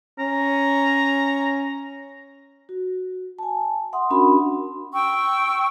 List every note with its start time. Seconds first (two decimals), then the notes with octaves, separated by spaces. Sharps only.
0.19 C#4 A#5
2.69 F#4
3.39 G#5 A5
3.93 E5 F#5 C6 D#6
4.10 C#4 D4 F#4 A#4 B5 C6
4.93 G5 C#6 E6